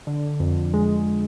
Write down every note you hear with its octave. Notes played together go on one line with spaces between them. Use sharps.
D3
F2
G#3